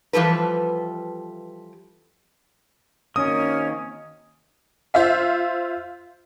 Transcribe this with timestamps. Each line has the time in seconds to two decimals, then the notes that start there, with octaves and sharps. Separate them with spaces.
0.13 E3 F3 G3 A4 B4
3.16 D#3 A#3 C4 C#4 F#4 D#5 D#6
4.94 F4 C5 E5 F5